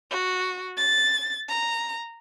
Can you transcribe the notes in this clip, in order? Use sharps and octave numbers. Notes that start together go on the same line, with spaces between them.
F#4
A6
A#5